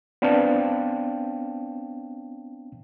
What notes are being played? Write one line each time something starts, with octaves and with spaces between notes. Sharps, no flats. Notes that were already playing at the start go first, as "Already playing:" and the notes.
B3 C4 D4 F5 G5 A5